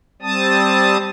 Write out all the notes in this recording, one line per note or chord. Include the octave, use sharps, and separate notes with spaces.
G3 C4 A5 D#6